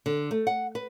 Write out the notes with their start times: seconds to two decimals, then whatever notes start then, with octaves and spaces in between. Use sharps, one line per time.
0.06 D3
0.31 A3
0.47 F#5
0.75 B4